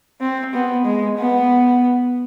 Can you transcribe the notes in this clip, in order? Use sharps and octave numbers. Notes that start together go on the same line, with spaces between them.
C4
B3
G#3
B3